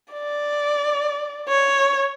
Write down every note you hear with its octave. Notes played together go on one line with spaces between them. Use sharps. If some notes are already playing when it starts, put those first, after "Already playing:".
D5
C#5